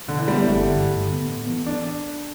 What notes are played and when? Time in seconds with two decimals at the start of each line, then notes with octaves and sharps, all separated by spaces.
0.08 B2 D3
0.18 E3
0.28 G3 G4
0.32 B3
0.38 G3
0.48 G1 A3
0.68 G2 D3
0.88 G2
1.07 D3 B3
1.26 A2
1.47 E3 B3
1.66 D4